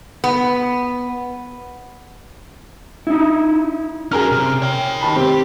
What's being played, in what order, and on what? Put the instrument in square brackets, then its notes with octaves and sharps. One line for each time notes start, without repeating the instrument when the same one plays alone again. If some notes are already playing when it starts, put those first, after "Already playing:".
[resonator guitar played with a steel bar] B3
[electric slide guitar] D#4 E4
[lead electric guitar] C#4 F#4 [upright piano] G#4 A#4 F6
[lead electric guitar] C3
C#5 G5
[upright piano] D#3 A5 B5
[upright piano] C3 C4 [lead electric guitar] G4